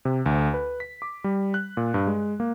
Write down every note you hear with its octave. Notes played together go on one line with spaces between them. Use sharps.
C3
D2
B4
B6
D6
G3
F#6
A#2
G2
G#3
A#3